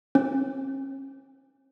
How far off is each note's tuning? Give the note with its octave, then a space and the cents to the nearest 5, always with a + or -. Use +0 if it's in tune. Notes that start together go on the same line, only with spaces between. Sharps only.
C#4 -40